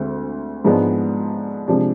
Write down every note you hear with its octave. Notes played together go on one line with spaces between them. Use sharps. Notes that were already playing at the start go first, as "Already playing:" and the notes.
Already playing: D2 D3 G#3 C4
G#2 F3 G#3 B3 D4
C3 F3 G#3 D4